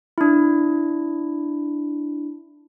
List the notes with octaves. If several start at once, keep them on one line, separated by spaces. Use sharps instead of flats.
D4 E4